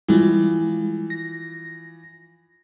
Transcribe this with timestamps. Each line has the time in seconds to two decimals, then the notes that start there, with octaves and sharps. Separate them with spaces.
0.08 E3 F3 G3 G#3
1.10 A#6